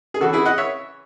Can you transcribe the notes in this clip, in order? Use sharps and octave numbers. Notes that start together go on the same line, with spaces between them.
G#4
C#3 E3 F#4 A4
E4 G#4
D#5 F#5
C#5 E5